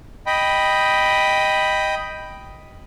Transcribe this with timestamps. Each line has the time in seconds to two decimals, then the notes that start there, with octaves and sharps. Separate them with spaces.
0.26 D#5 G5 B5